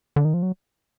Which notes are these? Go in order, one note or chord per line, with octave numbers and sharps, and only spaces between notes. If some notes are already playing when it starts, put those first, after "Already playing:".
D3
D#3
F3
F#3